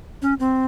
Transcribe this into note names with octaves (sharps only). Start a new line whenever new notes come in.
C#4
C4